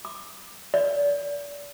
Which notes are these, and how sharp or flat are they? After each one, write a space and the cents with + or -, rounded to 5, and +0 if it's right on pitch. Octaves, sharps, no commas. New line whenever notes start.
D6 +25
D5 -35